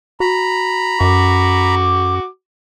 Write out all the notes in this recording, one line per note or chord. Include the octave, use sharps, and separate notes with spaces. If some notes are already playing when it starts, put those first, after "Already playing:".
F#4 A#5 B5
F#2 F#4 D6